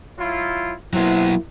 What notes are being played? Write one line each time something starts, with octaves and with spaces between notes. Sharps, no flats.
F#3 E4 F4
C3 F#3 A#3 B3 E4